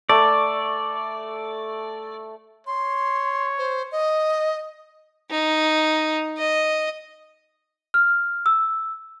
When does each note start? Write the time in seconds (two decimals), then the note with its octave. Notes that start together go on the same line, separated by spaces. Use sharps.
0.09 A3 D5
2.67 C#5 C6
3.58 C5
3.92 D#5
5.31 D#4
6.38 D#5
7.94 F6
8.46 E6